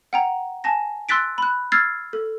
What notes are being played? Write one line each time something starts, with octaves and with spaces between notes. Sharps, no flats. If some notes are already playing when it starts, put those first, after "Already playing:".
F#5 G5 A#5
G#5 A5 A#6
C6 E6 F#6 A6 B6 D7
B5 F#6
E6 F6 G#6 A6 C7
A4